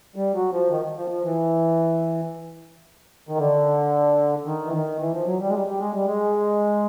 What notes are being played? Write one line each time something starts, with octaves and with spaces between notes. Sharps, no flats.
G3
F#3
F3
D#3
F3
F3
E3
D#3
D3
D#3
E3
D#3
E3
F3
F#3
G3
G#3
G3
G3
G#3
G3
G#3